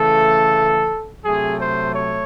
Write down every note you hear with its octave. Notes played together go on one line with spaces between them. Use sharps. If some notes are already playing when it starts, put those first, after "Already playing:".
Already playing: C#3 E3 A3 A4
C3 F#3 A3 G#4
C5
C#5